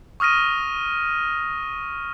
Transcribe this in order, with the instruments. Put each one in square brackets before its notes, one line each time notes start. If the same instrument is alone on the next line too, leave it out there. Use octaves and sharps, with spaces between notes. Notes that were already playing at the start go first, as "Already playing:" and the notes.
[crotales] C#6 D#6 F6 A#6 D#7